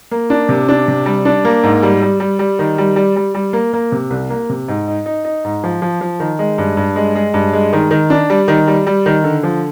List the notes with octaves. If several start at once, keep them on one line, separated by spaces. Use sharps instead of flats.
A#3
D4
C3
D4
C3
G3
D4
A#3
G#2
G3
G3
G3
G3
D#3
G3
G3
G3
G3
A#3
A#3
C3
C2
A#3
C3
G#2
D#4
D#4
D#4
G#2
F3
F3
F3
D#3
G#3
G2
G2
G#3
G#3
G2
G#3
D#3
D#3
D4
G3
D#3
G3
G3
D#3
D3
F3